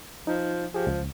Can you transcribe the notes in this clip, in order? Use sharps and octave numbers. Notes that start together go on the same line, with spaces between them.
F3 D#4
F3 G4 G#4
C#2